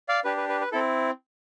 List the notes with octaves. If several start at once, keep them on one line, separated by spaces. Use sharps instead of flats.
D5 F5
D4 G4 B4
B4
B4
B4
C4 E4 A4